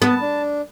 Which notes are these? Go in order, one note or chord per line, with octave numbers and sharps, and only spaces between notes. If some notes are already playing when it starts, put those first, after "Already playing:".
B3 A5
D4